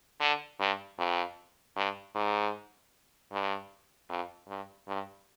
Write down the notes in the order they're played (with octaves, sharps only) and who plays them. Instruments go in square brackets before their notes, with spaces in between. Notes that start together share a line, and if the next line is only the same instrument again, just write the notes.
[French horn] D3
G2
F2
G2
G#2
G2
F2
G2
G2